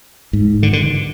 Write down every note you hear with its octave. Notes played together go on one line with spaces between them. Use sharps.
G#2
D3
D3